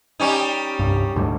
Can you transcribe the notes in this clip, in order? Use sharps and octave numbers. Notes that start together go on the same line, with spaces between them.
G3 C#4 D#4
C2 G2
D2 G#2 G3